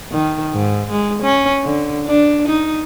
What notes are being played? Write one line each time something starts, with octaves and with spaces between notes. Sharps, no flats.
D#3
G#2
G#3
C#4
D3
D4
D#4